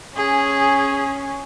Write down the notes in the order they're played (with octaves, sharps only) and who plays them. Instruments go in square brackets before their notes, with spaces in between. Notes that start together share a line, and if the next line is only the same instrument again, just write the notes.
[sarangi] C#4 [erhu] G#4